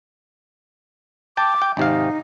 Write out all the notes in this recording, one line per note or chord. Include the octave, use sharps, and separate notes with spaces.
G5 A5 D6
G5
G#1 C3 D#4 F5